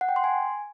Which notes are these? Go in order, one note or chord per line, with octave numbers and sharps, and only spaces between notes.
F#5
G5
C6
G#5